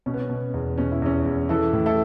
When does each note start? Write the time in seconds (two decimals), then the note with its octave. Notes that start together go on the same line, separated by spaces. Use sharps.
0.06 B2 C#4
0.14 B3
0.21 C#4
0.30 B2
0.54 E2
0.78 B2 C#4
0.92 E4
1.02 E2 C#4
1.26 E2
1.49 E3 E4 A4
1.73 A2
1.86 E4 A4